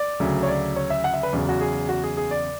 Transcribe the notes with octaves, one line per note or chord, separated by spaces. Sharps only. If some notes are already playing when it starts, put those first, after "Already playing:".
Already playing: D5
D2 C#3 F#3
C#5
D5
C#5
E5
F#5
E5
B4
E2 C#3 F#3
F#4
G#4
F#4
G#4
G#4
D5